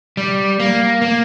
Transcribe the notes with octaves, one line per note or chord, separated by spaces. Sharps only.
G3
A#3
A#3